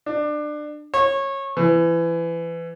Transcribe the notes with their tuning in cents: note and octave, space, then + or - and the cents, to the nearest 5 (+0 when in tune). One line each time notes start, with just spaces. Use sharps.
D4 +25
C#5 -20
E3 +25